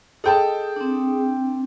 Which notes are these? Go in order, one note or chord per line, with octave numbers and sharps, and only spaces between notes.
G#4 A4 D#5 G5 A5
C4 D4